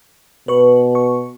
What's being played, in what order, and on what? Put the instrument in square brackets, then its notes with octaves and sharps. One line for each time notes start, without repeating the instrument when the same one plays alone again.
[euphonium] B2 [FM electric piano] B4 C#6
[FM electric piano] C#6